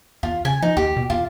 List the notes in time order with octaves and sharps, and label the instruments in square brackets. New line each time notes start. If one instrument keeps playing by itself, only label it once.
[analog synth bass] E2 [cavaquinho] F4
[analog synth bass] C#3 [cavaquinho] G#5
[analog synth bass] F3 [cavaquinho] D#4
[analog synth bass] D#2 [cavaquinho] G4
[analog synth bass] B2
[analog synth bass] E2 [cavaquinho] F4